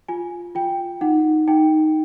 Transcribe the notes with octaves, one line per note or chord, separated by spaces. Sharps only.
F4 G#5
F4 G5
D#4 F#5
D#4 G5